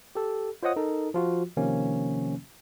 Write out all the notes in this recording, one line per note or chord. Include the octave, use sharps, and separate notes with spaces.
G4 A4
F4 C5 C#5 D#5 F#5 D#6
D#4 A4 A#4
F3 F4 F#4
C3 D#3 F3 A#3 C#4